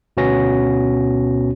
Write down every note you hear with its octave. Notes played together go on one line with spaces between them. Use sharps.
D2 B2 B3 C#4 F#4 A#6